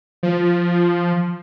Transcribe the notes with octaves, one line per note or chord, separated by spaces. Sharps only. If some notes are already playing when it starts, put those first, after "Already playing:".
F3